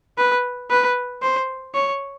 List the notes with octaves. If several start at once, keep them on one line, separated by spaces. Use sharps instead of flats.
B4
B4
C5
C#5